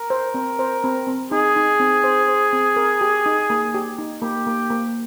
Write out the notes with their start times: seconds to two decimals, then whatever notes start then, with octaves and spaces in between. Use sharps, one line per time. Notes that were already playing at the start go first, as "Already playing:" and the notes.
Already playing: A#4
0.10 C5
0.34 C4
0.59 C5
0.84 C4
1.07 C4
1.31 D#4 G#4
1.56 D#4
1.79 C4
2.04 C5
2.28 C5
2.53 C4
2.76 A#4
3.01 G4
3.26 D#4
3.50 A#3
3.74 G4
3.98 D#4
4.22 A#3 G4
4.46 A#3
4.70 A#3